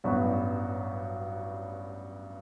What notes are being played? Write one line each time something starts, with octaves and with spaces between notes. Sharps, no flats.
A1 G2 F#3 B3 F#4